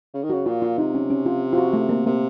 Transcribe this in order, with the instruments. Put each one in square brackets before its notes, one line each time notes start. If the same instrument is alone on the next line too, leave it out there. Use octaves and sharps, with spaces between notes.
[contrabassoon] C#3
D#3
[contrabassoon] C#3 [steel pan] F#4
[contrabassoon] A#2 [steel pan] F4
[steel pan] F4
[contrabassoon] C3 [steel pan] D#4
[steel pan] C#4
C#4
F4
F4
F#4
A3
A#3
[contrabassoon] C3 [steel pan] A#3